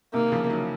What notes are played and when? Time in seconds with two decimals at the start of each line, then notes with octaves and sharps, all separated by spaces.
0.14 C3 D#3 A#3
0.31 C#3 F3
0.50 D#3 F#3